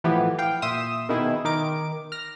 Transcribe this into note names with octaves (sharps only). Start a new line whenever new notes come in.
A2 E3 F3 B3 E4 G4
F5 G5
A#2 E5 C6 D#6 E7
B2 D#3 B3 D#4 E4 G#4
D#3 A#4 D6 D7
F6 A#6